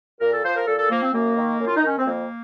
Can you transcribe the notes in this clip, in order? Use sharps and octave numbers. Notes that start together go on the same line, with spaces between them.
A#2 A#4
A4
F3 C5
A#4
A#2 A4
A4
F3 A#3
C4
F#2 A#3
D#3
F#2
F4
D#4
D#3 C#4
C4
F2 A#3